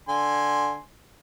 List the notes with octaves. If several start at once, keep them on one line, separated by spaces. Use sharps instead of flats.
D3 G#5 C6